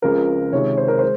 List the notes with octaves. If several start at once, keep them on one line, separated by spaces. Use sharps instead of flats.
C#2 C#3 F3 C4 A#4
C3 D#3 G#3 C#5
C5
A#4
G#3 C5